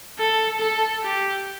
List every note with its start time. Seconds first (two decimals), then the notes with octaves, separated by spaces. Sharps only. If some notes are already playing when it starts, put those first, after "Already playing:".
0.19 A4
0.61 A4
1.03 G4